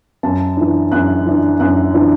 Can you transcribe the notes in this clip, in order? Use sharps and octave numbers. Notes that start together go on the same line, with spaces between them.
F#2 A5
E3 D4
F#2 F#6
E3 D4
F#2 F#6
E3 D4